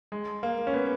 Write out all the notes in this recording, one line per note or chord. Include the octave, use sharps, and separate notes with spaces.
G#3
A#3
C#4
B3